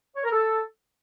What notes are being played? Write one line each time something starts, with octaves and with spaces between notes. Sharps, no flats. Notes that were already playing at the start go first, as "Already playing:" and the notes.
C#5
A#4
A4